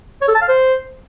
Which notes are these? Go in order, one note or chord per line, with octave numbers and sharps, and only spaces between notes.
C#5
A4
A5
F5
C5